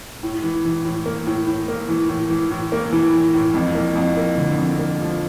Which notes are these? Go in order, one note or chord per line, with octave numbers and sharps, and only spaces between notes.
A2
E3
E3
A2
A#3
A2
A2
A#3
E3
A2
E3
A2
A#3
E3
A2
A2
F2
A#3
F2
A#3
D3
F2
A#3
F3